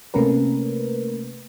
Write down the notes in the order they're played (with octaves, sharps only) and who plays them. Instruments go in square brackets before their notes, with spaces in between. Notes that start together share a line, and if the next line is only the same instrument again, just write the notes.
[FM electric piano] C3 A3 A#3 C#4 A#4 B4